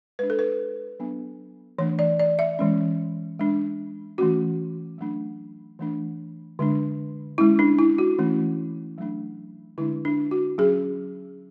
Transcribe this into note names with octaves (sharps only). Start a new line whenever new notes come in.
G#3 D4 B4
A4
B4
F#3 B3 D4
E3 A3 D4 C#5
D5
D5
E5
E3 G#3 C#4
G#3 D4
E3 A3 C#4 F#4
F#3 A3 D4
E3 A3 D4
D3 G#3 D4
G#3 C#4 E4
D4
E4
F#4
E3 A3 C#4
F#3 A3 D4
D3 G#3 D4 E4
D4
F#4
F#3 C#4 G#4